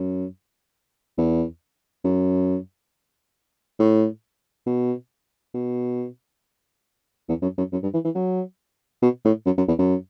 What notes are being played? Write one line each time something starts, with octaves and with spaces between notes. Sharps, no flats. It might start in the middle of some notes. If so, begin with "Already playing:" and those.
Already playing: F#2
E2
F#2
A2
B2
B2
E2
F#2
F#2
F#2
G2
E3
E3
F#3
B2
A2
F#2
F#2
E2
F#2